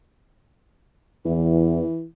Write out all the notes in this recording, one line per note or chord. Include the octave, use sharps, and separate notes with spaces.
E2 E3